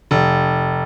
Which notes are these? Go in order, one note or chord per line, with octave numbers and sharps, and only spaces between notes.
F1